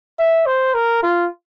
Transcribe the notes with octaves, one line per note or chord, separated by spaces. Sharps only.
E5
C5
A#4
F4